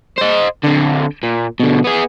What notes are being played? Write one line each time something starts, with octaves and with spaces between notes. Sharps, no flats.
C5 D#5
D3 C4
A#2
B2 D3
B3 G#4